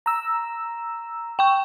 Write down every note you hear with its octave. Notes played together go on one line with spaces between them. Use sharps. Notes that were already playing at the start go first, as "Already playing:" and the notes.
A#5 E6
G5 C#6